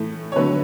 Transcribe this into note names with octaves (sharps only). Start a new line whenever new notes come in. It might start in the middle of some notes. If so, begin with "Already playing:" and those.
Already playing: A2 E3 A3
C#5
D3 F#3 A3 B4